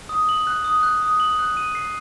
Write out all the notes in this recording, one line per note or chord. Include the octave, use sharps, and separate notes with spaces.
D#6
F#7
F#6
D#6
F#6
D#6
F#7
F#6
D#7
C7